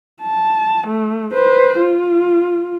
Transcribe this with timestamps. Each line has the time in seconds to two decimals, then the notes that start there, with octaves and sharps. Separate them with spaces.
0.21 A5
0.87 A3
1.33 B4 C5
1.79 F4